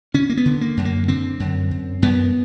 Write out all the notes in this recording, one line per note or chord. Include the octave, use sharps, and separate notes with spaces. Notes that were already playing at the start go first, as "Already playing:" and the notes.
D3 C#4
A#3
B3
D3
A#3
F#2
A#3
D3 C4
F#2
F#2
F#2 B3